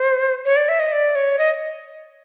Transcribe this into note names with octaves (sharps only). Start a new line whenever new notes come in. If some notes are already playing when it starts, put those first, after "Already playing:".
Already playing: C5
C#5
D5
E5
D#5
D5
C#5
D#5